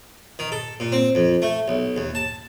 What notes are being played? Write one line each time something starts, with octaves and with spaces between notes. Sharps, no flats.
D#3
A4
A#2
C4
F2
A3
B1
D#2
A5